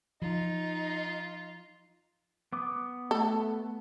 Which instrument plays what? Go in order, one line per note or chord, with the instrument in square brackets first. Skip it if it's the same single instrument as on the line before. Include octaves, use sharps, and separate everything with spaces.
[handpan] F3 [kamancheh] D#4 [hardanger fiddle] F4
[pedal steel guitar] B3 D6 D#6
[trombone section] A3 [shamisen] A4